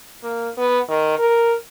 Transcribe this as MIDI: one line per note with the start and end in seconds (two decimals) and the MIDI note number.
0.23 0.49 58
0.58 0.79 59
0.89 1.19 51
1.19 1.55 70